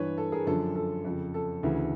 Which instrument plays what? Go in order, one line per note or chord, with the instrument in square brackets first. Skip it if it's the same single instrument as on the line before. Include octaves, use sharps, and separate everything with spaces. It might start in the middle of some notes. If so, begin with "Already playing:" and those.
Already playing: [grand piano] G2 E3 B4 C#5
A4
G#4 A#4
F#2 D3 F3 A4
A4
F2 C#3 F3
A4
D2 C#3 E3